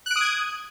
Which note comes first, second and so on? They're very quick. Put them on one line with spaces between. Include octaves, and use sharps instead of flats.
F#6 D7 D#6 G#6